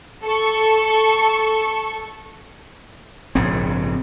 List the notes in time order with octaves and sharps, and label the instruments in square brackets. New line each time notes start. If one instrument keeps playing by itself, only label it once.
[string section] A4 C#6
[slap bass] A#1 G#2 C#3 C4